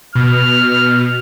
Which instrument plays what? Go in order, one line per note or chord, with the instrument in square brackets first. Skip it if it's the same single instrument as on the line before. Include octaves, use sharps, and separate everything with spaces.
[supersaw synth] B2 [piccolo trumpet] F6